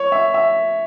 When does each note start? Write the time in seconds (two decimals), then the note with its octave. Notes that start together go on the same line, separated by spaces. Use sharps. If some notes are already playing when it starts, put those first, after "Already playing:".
Already playing: C#5
0.12 E5
0.34 E5